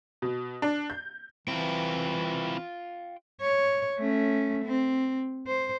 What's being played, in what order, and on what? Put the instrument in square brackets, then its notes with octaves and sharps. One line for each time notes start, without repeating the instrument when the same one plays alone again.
[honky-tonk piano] B2
D4
G6
[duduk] E3 [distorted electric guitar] C4 E4 [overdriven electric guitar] F4 G5
[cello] C#5
A3 C#4
C4
C5